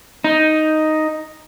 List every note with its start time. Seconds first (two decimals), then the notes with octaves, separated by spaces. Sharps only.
0.24 D#4